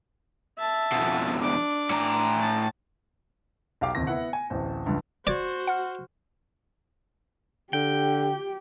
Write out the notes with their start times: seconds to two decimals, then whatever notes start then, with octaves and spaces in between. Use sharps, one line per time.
0.58 E5 A5
0.92 F2 B2
1.43 D4 D6
1.90 A2 A#5
2.39 A5
3.81 B1 G4 F5 D6
3.95 D1 D#2 C3 A#6
4.07 B3 E4 F#5
4.33 G#5
4.50 D1 A1 C5
4.86 C#2 G2 F3
5.27 F#4 C5 D5 G#6
5.67 F#5 F6
7.73 D3 G4 G5